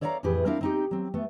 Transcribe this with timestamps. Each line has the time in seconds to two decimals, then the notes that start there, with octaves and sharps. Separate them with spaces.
0.01 A4 C#5 D5 F5 G#5 A#5
0.23 F2 A2 E3 G4 G#4 B4
0.45 A#3 C4 D4 E4 A#4 F5
0.61 C4 D#4 G4
0.91 F#3 C4
1.14 A3 B3